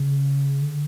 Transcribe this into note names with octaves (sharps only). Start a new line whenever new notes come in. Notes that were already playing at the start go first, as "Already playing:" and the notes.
Already playing: C#3
D3